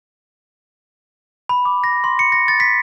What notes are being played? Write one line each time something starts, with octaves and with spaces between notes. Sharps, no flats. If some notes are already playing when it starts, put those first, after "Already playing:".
B5
D6
A#6
C6
C#7
A#6
A6
B6